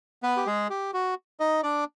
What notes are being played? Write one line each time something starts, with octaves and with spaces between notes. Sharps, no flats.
B3 B4
G4
G#3 G#4
G4
F#4
D#4 D#5
D4 D5